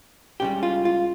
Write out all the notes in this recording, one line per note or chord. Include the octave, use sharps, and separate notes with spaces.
C#2 C#3 G3 G4
F4
F4